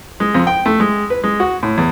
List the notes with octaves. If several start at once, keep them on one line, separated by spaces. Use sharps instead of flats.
G#3
F2
G5
A3
G#3
B4
G#3
F#4
A2
E2